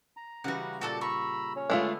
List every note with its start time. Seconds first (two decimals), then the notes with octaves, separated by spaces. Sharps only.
0.17 A#5
0.44 C#3 E3 G3 F#4 F#5
0.81 A#2 F#4 A4 D5
1.01 A#5 B5 C#6 E6
1.56 C#4 C#5
1.70 D3 G#3 A3 B3 F4 E5